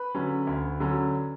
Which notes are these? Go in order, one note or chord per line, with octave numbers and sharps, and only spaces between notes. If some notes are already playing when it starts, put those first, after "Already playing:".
Already playing: B4 B5
D3 F#3 C#4
D2
D3 F#3 C#4